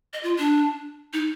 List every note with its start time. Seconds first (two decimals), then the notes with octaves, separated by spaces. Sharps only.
0.13 D#5
0.23 F4
0.39 D4
1.13 D#4